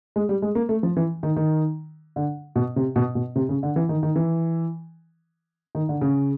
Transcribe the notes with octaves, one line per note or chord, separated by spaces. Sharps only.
G#3
G3
G#3
A#3
A3
F3
E3
D#3
D#3
D3
B2
C3
B2
B2
C3
C#3
D3
E3
D#3
D#3
E3
D#3
D3
C#3